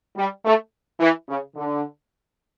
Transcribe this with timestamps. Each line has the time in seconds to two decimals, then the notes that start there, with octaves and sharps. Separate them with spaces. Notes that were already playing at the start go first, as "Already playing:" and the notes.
0.17 G3
0.45 A3
1.00 E3
1.28 C#3
1.56 D3